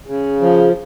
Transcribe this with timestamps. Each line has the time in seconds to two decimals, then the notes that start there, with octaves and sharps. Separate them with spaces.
0.07 C#3
0.41 F3